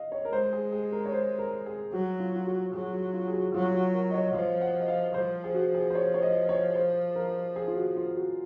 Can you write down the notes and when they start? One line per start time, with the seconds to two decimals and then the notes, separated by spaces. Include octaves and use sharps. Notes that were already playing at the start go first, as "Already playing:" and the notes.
Already playing: D#5 F5
0.12 C#5
0.25 A#4
0.32 G#3 C5
0.53 G#4
0.72 G#4
0.92 A#4
1.06 C#5
1.12 C5
1.39 A#4
1.66 G#4
1.93 F#3 F#4
2.20 F4
2.35 F4
2.47 F#4
2.73 F#3 G#4
2.93 F#4
3.14 F4
3.28 G#4
3.34 F#4
3.54 F#3 F4
3.64 F4
3.74 F#4
3.94 A#4
4.10 D#5
4.14 C#5
4.34 F3 F5
4.61 F#5
4.81 D#5
4.88 F5
5.14 F3 C5
5.44 G#4
5.55 F#4
5.75 G#4
5.90 C5
5.95 C#5
6.14 C#5
6.22 D#5
6.49 C#5
6.76 C5
7.15 A#4
7.56 G#4
7.67 F4
7.76 F#4
7.96 F4
8.16 F#4